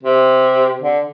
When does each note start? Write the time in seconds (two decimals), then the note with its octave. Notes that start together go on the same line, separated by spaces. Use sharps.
0.03 C3
0.82 D3